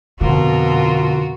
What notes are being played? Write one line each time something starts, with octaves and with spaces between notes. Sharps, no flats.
F2 B2 D3 F4 F#4 A#4